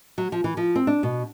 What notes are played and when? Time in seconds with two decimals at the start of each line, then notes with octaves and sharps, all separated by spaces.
0.18 F#3
0.32 F3
0.44 E3
0.57 F3
0.75 C4
0.87 D4
1.03 B2